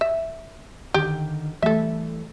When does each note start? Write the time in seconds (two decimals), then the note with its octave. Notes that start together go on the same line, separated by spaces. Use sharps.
0.01 E5
0.94 D3 D#3 G4
1.62 E3 G3 A3 A4 E5